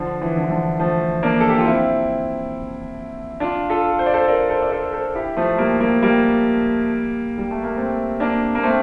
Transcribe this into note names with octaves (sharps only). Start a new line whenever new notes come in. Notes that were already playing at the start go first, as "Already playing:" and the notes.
Already playing: D3 F3
E3
D3
E3
D3 F3
F3 A3
A#3 D4
A4
G4
F4
C4 E4
D4 F4
F4 A4
C5
D5
A4 C5
A#4 D5
A4 C5
D5
A4 C5
A4 C5
E4 G4
F3 A3
G3 A#3
G3 A#3
G3 A#3
G3
A3
A#3
A3 C4
A#3 D4
A#3
A3 C4